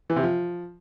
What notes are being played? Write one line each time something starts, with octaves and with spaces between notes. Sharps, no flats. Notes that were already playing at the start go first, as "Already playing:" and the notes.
E3
C3
F3